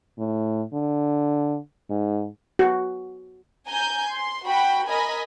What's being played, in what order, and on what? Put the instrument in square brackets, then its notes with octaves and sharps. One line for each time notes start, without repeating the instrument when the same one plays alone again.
[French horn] A2
D3
G#2
[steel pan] F#4
[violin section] G#5 A#5 G6
C6
F#4 G5 B5
A#4 D#5 G#5 A#5 B5